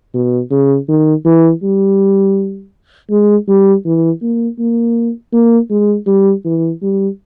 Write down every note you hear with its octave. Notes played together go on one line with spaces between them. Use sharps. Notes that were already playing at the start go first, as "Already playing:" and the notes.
B2
C#3
D#3
E3
G3
G#3
G3
E3
A#3
A#3
A#3
G#3
G3
E3
G3